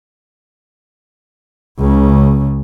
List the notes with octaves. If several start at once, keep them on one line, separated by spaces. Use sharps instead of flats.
C#2 C#3